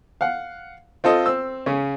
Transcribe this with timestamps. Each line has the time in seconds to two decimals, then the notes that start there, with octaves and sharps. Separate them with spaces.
0.21 F5 F#5
1.04 C4 F4 A4 D#5
1.26 C4 E6
1.66 C#3 C#4